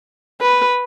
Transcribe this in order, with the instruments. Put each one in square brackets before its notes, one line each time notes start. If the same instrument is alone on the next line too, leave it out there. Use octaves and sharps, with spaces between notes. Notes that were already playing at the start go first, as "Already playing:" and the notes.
[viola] B4